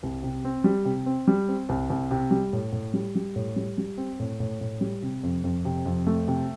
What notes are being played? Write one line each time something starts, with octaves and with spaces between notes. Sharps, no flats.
C2
C3
C4
G3
C3
C4
G3
C4
C2
C2
C3
G3
A2
A2
G3
G3
A2
G3
G3
C4
A2
A2
A2
G3
C3
F2
F2
C3
F2
A3
C3